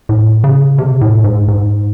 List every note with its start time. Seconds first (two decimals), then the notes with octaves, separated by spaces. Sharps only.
0.09 A2
0.44 C#3
0.78 C3
1.01 A2
1.24 G#2
1.48 G#2